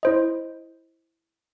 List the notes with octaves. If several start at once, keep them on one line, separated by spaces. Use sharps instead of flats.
E4 C5 D#5